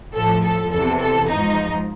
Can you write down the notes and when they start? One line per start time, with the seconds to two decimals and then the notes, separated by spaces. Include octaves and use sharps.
0.15 A2 F3 A4
0.43 A4
0.71 E2 C3 E3 A4
1.01 A4
1.28 G#2 F3 D#4